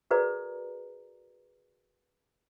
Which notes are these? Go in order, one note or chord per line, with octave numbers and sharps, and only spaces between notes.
F#4 G#4 A#4 B4 D5 A#5